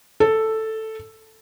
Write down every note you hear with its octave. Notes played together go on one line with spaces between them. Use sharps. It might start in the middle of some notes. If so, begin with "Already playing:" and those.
A4